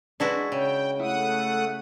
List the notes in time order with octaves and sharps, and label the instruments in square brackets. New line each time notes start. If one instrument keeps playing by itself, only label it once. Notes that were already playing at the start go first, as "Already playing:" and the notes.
[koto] G#3 E4 F#4 [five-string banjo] D4 B4
[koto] C#3 [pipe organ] G5
[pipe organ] A3 F#5 D#6 [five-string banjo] E4